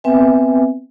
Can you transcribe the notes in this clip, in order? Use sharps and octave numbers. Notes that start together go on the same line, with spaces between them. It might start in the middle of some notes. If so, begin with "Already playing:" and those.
B3 C4 B4 E5 G5 G#5